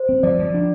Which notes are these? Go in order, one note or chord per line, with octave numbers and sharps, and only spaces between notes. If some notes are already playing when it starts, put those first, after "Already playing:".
Already playing: C5
C4
F3 D5
F3
D4